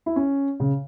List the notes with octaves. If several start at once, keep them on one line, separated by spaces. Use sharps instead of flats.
E4
C#4
C#3